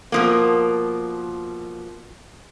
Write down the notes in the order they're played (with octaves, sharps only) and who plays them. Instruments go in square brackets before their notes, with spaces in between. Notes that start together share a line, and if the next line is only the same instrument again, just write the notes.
[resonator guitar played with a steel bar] B2 F3 A#3